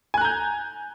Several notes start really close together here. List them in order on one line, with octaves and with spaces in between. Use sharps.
G#5 F#6 A#5 G6